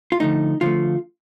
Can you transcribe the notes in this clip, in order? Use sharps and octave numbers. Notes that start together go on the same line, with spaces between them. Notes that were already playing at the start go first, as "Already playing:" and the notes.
F4
D3 F3 A3 D#4
D3 F3 A3 F4